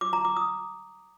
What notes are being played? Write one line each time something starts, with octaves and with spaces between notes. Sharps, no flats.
D6
A#5
D6
D#6